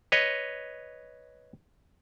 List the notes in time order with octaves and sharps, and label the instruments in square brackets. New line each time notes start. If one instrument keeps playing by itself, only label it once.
[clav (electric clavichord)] B4 C#5 D#5